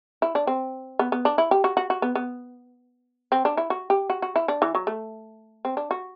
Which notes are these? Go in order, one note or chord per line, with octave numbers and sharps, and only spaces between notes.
E4
D4
C4
B3
B3
D4
E4
G4
F#4
F#4
F#4
B3
B3
C4
D4
E4
F#4
G4
F#4
F#4
E4
D4
E3
F#3
A3
C4
D4
F#4